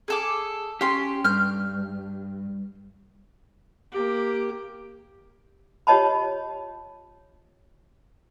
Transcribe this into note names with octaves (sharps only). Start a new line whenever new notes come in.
G#4 A4 D6
C#4 G4 C6
G2 F6 G6
A#3 G4
F4 G4 C#5 D#5 A5 B5